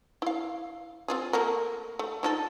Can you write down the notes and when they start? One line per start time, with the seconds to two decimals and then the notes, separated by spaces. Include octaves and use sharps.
0.22 E4 F5
1.08 C4 F4 G#4
1.33 A3 A#3 A#4
1.99 A3
2.23 F3 D#4 A4